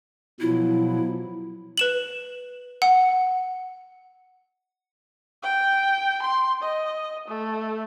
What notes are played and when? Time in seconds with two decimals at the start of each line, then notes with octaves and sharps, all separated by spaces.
0.40 B2 F3 F#3 E4
1.78 B4 E7 F#7
2.82 F#5
5.43 G5
6.22 C6
6.62 D#5
7.28 A3